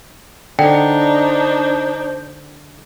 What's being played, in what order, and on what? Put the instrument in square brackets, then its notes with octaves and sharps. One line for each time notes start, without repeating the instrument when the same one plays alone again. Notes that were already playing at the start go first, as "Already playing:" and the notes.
[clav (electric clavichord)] D3 [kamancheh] D4 D#4 [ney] C5 [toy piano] G5